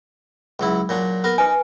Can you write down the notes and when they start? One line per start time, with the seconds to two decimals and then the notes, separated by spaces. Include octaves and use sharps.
0.60 C#2 F#3 E4
0.89 A#2 F#3 D4
1.24 B3 A#4
1.38 D#4 B4 G#5